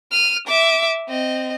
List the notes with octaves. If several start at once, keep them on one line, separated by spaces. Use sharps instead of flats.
F6 D#7
E5 D6
C4 D#5